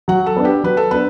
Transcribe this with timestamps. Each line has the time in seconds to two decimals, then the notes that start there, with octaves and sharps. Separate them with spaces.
0.08 F#3 F#5
0.26 A4
0.37 B3 D4
0.45 G4
0.63 F#3 B4
0.77 A4
0.91 B3 D4 B4